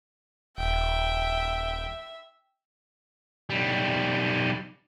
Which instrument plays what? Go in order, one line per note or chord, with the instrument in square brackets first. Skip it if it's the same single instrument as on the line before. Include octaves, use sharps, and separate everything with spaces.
[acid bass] D#1 [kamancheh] E5 [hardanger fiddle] G5
[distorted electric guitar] B1 G3